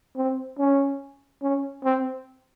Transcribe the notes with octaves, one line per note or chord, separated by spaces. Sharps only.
C4
C#4
C#4
C4